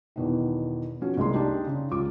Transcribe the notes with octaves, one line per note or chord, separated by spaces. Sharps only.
E2 B2 D#3
F3 B3 C#4 F#4
C2 G#3 A#3 C6
D4 D#4 G4
C#3
C#2 F4 D6